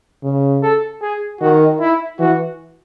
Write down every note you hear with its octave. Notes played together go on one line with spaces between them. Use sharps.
C#3
A4
G#4
D#3 F#4
E4
E3 F#4